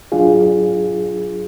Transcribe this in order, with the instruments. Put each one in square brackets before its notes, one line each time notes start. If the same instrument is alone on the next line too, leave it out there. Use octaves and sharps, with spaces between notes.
[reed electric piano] F#3 D4 F4 G#4